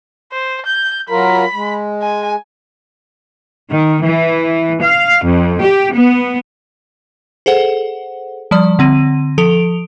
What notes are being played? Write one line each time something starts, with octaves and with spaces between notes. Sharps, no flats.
C5
G6
F#3 F4 A#4 B5
G#3
G#5
D#3
E3
F5
F2
G4
B3
G#4 A4 C5 F#5
F3 G3 D5
D3 C4 D#7
F3 A4 D7 F7